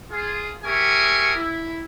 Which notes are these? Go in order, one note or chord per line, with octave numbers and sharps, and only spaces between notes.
F4 G#4
G4 G#4 A#4 E5 G#5 C#6
E4